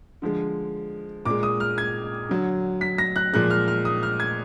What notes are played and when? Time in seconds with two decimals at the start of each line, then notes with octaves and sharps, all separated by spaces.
0.22 D3 F3 G#3
1.25 A#2 G#3 D6
1.43 D#6
1.60 F6
1.78 G#6
2.29 D3 F#3
2.81 B6
2.98 A#6
3.16 F#6
3.33 A#2 F3 G#3 F#6
3.50 F6
3.68 F6
3.85 D#6
4.03 F6
4.20 G#6